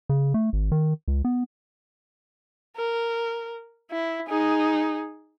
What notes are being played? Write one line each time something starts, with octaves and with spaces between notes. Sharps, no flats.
C#3
A3
G#1
D#3
C#2
B3
A#4
E4
D#4 G#4